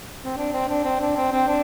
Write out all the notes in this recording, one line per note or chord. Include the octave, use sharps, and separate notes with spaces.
C4
D4
C4
D4
C4
D4
C4
C4
D4